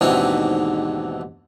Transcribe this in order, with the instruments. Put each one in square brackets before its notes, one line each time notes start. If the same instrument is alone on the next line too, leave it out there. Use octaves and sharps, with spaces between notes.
[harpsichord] D#2 G#2 B2 E3 C4 D4